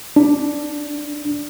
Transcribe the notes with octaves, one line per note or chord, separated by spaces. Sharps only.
D4